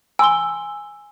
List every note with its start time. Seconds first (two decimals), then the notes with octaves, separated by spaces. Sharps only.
0.19 G#5 C6 E6 G7